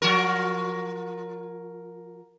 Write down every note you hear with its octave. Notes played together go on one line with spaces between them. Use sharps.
F3 F#4 A#4